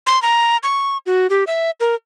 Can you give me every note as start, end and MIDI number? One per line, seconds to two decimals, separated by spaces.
0.07 0.21 84
0.22 0.57 82
0.63 0.98 85
1.06 1.27 66
1.30 1.44 67
1.47 1.71 76
1.80 1.95 70